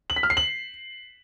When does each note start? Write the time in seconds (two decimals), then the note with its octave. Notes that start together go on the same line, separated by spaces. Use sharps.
0.10 F#7
0.16 B6
0.23 F6
0.30 C7
0.37 F#7